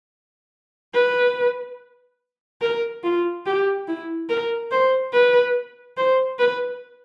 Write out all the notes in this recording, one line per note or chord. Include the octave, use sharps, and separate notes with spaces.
B4
A#4
F4
G4
E4
A#4
C5
B4
C5
B4